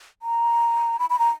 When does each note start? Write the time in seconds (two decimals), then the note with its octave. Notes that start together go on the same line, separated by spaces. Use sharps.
0.22 A#5
0.99 B5
1.10 B5
1.19 A#5